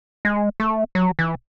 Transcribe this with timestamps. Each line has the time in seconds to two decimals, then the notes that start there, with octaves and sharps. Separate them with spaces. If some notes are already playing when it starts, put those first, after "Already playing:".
0.25 G#3
0.60 A3
0.95 F#3
1.19 E3